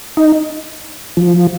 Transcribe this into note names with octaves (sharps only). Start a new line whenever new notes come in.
D#4
F3